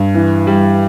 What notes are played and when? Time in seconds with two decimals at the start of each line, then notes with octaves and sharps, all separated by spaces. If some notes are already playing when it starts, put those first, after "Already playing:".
Already playing: G2
0.14 E3
0.47 G3